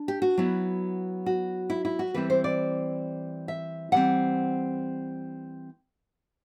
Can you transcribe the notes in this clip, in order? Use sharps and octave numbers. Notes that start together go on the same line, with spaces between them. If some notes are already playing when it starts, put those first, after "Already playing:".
Already playing: D4
G4
F#4
F#3 B3 E4
F#4
E4
E4
F#4
E3 G3 C4 E4 B4
C5
D5
E5
E3 G3 C4 F#5